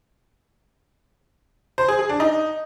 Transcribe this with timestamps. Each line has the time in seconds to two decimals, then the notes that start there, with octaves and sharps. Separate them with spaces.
1.78 C5
1.88 G#4
1.99 G#4
2.09 D4
2.20 D#4